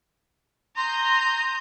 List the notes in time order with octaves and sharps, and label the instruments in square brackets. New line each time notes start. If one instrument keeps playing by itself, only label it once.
[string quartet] A#5 D#6 G6 [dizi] C6